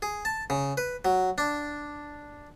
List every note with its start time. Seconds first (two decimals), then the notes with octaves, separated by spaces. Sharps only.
0.02 G#4
0.25 A5
0.50 C#3
0.77 B4
1.05 F#3
1.38 D4